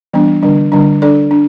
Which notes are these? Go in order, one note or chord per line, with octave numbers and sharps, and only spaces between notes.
E3 G3 B3 D4
D3 G3 D4
D3 G3 D4
D4 A4 D5
D4